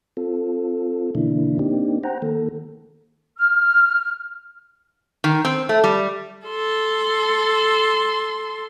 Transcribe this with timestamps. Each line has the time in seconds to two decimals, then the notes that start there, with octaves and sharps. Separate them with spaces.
0.17 C4 F4 A4
1.15 B2 D3 E3 A#3 D4 E4
1.59 A#3 C4 D4 D#4 G4
2.03 C5 F#5 G5 A#5
2.22 D#3 A#3 A4
3.37 F6
5.24 D#3
5.45 C4
5.69 A3
5.84 G3
6.47 A4 C6